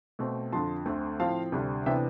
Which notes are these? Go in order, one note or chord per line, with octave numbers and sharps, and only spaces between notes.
B2 A3 C4
F2 D3 F3 A5 C6
D2 D3 A3 C4
A2 F3 C4 F5 A5
D2 C3 G3 D4
C3 E3 B3 D4 E5 G5